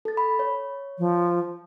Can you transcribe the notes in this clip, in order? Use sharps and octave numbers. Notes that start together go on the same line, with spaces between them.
A4 A6
B5
C#5
F3